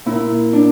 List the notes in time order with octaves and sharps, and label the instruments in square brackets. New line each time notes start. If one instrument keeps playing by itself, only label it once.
[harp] A#2 E4
D4